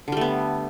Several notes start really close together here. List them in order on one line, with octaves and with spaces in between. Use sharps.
D3 G3 A3 B3